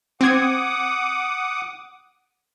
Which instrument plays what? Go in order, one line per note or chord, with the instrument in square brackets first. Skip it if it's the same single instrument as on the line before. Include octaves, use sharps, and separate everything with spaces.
[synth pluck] C4 G#6 [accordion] F#5 D6 D#6